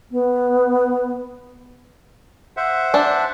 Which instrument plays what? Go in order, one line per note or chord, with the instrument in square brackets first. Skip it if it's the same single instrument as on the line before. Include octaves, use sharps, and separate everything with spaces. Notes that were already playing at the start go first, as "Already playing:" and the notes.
[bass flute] B3
[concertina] C5 E5 F#5
[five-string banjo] D4